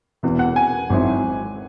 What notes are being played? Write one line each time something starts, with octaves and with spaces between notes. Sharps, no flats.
E1 E2 C3 E3
F#5
G#5
G#1 G#2 F#3 C4 E4